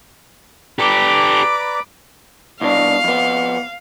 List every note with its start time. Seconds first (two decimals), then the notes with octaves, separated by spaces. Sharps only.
0.79 G4 A4 B4 D5 A#5 B5 D6
2.61 C2 B2 D4 F5
3.04 F2 B3